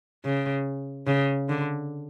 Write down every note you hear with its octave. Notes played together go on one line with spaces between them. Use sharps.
C#3
C#3
D3